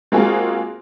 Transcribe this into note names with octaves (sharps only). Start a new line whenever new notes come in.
G#3 A#3 C4 F4 F#4 G#4